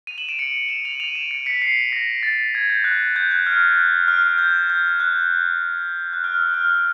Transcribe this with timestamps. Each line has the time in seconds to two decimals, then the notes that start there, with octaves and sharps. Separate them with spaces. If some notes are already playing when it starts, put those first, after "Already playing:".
0.07 D#7 F7
0.18 E7 F#7
0.29 D7 E7
0.39 C#7 D#7
0.69 E7 F#7
0.85 D#7 F7
1.00 D#7 F7
1.15 D7 E7
1.31 C#7 D#7
1.46 B6 C#7
1.62 C7
1.77 C7
1.93 A#6
2.23 A6
2.55 G#6
2.69 G6
2.84 F#6
3.16 G6
3.31 F#6
3.47 F6
3.77 F#6
4.08 F6
4.23 F6
4.38 G6
4.70 G6
5.00 F#6
6.13 F#6
6.24 F6
6.39 E6
6.54 F6